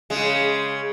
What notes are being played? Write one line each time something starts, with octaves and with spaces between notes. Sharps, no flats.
C#3 G#3